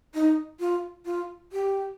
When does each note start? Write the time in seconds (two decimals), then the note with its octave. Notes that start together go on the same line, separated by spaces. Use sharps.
0.14 D#4
0.60 F4
1.06 F4
1.52 G4